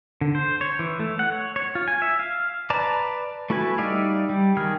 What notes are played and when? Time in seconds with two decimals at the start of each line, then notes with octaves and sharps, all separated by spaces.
0.21 D3
0.35 C5
0.61 C#5
0.79 E3
1.00 A3
1.19 F#5
1.32 C#5
1.56 C#5
1.75 F4
1.88 G#5
2.02 E5
2.19 F5
2.70 B4 D5 A5 A#5
3.50 A3 E4 F#4 B4 G#5
3.78 G3 D#4 D5 E5 F5
4.29 G3
4.57 D#3 G#4 G5 F6